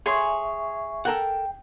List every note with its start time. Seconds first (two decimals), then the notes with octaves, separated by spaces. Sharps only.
0.06 G#4 C#5 E5 C6 C#6
1.05 A4 A#4 F#5 G5